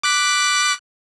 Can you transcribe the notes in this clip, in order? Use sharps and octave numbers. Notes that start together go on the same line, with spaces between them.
D6 F#6 B6